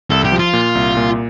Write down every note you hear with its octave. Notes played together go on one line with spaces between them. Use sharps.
C2 A4
G4
F3
F4
A#2
C2
A#2